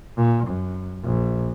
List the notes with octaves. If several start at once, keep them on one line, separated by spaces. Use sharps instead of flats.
A#2
F#2
A#1